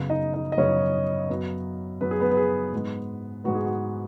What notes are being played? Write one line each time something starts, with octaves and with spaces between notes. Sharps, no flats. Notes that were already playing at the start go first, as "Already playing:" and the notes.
Already playing: F#2 C#3 B3
D#4 D#5
D#4 D#5
D#5
F#2 C#3 B3 C#4 C#5
F#2 F#3 B3
F#2 F#3 B3 B4
G#4
B3 B4
B4
G#4
G#2 G#3 B3
G#2 G#3 B3 F#4
G#4
F#4